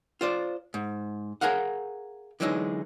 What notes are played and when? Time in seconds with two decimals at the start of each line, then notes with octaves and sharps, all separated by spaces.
0.21 F4 C5 D5
0.74 G#2
1.41 G#4 A#4 C#5 F5 F#5
2.40 D3 E3 F#3 G#3 C4 D#4